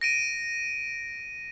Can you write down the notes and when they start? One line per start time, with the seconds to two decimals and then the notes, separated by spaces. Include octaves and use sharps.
0.01 A#6 D7 D#7